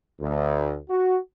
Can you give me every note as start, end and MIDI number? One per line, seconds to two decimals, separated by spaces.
0.20 0.78 38
0.90 1.18 66